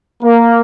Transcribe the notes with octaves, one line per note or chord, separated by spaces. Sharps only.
A#3